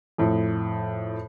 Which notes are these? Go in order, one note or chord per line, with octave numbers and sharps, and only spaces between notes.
F2 A2